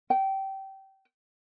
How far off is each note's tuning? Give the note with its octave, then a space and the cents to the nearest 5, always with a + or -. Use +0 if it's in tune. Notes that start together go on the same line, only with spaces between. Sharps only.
G5 -20